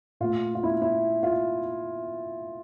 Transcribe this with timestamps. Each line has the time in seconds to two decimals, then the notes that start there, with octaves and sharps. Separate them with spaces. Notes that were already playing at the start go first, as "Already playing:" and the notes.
0.20 A#2 A3 F4
0.55 F4
0.63 E4
0.82 E4
1.23 F4